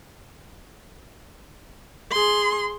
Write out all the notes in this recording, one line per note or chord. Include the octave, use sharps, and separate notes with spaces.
G#4 C6